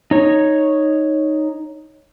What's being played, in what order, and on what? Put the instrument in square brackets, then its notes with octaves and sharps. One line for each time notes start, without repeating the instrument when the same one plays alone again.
[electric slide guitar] D#4 C#5